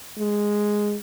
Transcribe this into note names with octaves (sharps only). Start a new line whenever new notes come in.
G#3